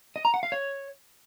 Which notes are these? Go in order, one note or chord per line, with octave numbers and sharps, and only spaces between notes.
D#5
A#5
F#5
F5
C#5